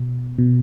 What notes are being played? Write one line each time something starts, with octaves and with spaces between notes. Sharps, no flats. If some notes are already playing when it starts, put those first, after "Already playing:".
Already playing: B2
B2